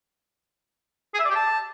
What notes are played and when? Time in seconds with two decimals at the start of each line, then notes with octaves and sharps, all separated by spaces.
1.14 G#4
1.19 E5
1.25 D5
1.30 G4
1.35 A5